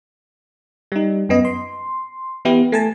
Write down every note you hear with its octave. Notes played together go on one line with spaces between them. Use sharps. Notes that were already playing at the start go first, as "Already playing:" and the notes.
G3 D#4
F#2 B3 D#5
C6
E3 B3 E4 G4
A3 G#5 A5